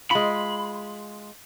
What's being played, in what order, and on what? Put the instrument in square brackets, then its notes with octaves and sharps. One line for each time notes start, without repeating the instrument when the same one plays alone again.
[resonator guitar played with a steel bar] G#3 F4 [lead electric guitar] B5